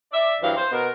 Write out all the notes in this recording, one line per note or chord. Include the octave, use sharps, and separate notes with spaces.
D5 E5
G2 E3 F#3 C5 F5
C5
B2 B3 A#4